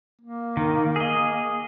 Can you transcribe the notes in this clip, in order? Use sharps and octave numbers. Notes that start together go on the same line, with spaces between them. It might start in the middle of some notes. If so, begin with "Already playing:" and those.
A#3
D#3
G#4 D#5